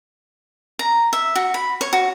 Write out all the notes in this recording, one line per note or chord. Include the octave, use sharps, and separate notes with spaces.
A#5
E5
F#4
B5
C#5
F#4